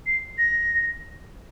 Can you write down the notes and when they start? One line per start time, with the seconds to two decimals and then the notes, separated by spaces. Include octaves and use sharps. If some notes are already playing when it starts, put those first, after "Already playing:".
0.06 C7
0.38 A#6